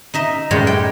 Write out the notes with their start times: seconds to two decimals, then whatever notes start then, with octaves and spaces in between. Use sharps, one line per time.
0.14 D#4 D#5 E5
0.51 F#2 A2 G3 G#3 G4 C#5
0.67 G5